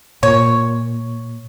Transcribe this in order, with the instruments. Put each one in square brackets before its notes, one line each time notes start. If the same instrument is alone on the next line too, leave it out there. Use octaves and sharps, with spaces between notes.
[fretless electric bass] A#2 [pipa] C#5